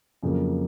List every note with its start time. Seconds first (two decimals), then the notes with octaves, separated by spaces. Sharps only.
0.23 F2 C#3 F#3 A#3